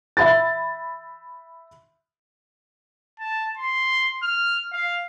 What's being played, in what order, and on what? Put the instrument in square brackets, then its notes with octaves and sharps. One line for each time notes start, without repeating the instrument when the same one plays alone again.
[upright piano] E5 B5 A6
[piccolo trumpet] A5
C6
F6
F5